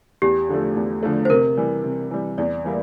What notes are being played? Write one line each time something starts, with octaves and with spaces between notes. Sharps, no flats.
E2 G4
D3 F3 A3
E2
D3 F3 A3
C5
C3 A#4
E3 G3
C3
E3 G3
E2 D5
E3 G3 A#3 E4